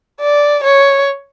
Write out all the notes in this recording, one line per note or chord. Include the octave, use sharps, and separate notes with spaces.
D5
C#5